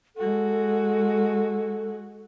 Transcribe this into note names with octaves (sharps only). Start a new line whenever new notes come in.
G#3 F#4 A4